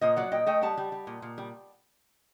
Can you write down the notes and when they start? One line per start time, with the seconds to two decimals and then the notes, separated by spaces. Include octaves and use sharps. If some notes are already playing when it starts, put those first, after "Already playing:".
0.01 A#2 C5 D#5
0.16 F#3 D5 F#5
0.32 A#2 D#5 G5
0.46 A3 D#5 G5
0.61 G3 F#5 A5
0.78 G3
0.92 G3
1.07 A#2
1.22 A#2
1.38 G3